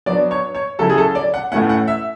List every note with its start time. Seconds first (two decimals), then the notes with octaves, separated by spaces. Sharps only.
0.06 F#3 B3 D4 D5
0.31 C#5
0.55 C#5
0.79 C#3 F#3 C#4 E4 A4
0.89 G#4
0.98 A4
1.15 D5
1.34 F#5
1.52 A2 E3 A3 C#4 E4 F#5
1.69 F#5
1.88 E5